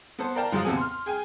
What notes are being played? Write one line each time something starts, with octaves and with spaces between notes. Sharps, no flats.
B3 A4 C5
A#4 D5 F5 G5 A5 A#5
G#2 F3 F#3 F4 D#6
D#2 C3 B3 A4 G#5
C6 F6
G#4 G5 G#5